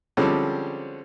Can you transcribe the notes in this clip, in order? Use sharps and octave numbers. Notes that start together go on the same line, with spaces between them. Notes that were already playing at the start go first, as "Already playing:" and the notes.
D3 F3 G3 G#3 C4 C#4